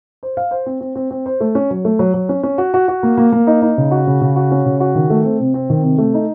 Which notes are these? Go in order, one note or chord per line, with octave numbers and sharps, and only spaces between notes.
C5
F5
C5
C4
C4
C4
C4
C5
A3
C#4
F#3
A3
F#3
F#3
C#4
C#4
F#4
F#4
F#4
A#3
A#3
A#3
D#4
D#4
C#3
F#4
C#3
C#3
F#4
C#4
C#3
F#4
D#3
A3
C4
C3
C4
D#3
C3
A3
D#4